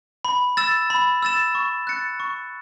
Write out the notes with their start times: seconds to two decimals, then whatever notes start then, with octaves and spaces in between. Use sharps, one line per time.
0.25 B5
0.57 E6 A6 E7
0.90 B5
1.22 E6 A6 E7
1.55 C#6
1.87 F#6 A6 C#7
2.20 C#6